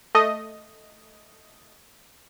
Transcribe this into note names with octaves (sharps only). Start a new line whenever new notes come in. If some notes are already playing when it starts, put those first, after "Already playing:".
A3 D#5